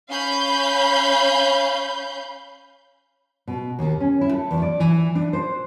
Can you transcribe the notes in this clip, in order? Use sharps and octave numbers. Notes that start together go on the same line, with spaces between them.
C#4 F5 B5 G6
B2
D#2
C#4
E4
A4
E2
D5
E3
D4
C5